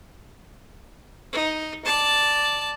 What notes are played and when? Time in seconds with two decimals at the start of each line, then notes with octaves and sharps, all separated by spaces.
1.32 D#4
1.85 D5 A5